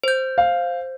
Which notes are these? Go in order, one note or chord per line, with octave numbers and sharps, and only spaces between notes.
C5 G6
F5